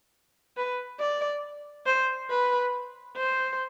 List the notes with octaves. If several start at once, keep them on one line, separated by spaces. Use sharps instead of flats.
B4
D5
C5
B4
C5